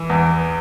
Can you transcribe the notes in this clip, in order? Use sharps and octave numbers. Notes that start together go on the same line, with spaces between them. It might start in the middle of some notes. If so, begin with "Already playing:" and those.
Already playing: E3
E2